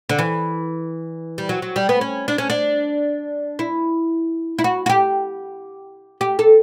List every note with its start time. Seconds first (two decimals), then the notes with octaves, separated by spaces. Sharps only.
0.09 D3
0.19 E3
1.38 G3
1.49 F#3
1.62 F#3
1.76 G3
1.89 B3
2.01 C#4
2.28 D4
2.38 C#4
2.50 D4
3.59 E4
4.59 E4
4.64 F#4
4.86 F#4
4.89 G4
6.21 G4
6.39 A4